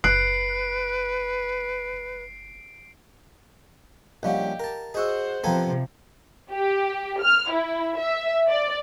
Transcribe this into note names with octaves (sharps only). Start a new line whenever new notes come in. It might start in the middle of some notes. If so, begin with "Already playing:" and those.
F#1 B4 F#6 C7 D7
A#1 G3 C#4 G4 D#5 F5 F#5
A#4 A5
F#4 G#4 C5 D#5 F#5 E6
C3 F3 B3 A4 F5 G5 G#5 A#5
G4
F6
E4
E5
D5